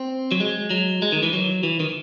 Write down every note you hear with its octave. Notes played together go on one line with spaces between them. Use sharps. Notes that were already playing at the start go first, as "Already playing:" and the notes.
Already playing: C4
F#3
G#3
F#3
G#3
D#3
E3
F#3
E3
D#3